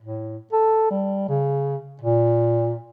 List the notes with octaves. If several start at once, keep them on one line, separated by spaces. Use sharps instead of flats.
A2
A4
G3
C#3
A#2